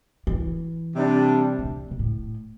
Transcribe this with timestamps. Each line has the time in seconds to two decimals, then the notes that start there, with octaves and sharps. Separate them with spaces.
0.27 E3
0.95 C3 G3 D4
1.59 A2
1.65 C3
1.91 C3
1.99 A2